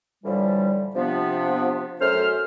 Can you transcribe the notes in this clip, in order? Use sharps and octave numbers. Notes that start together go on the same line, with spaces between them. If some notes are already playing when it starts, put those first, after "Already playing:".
A2 D3 E3 F3 G3
C3 F3 B3 D4
F#2 A3 C5 F6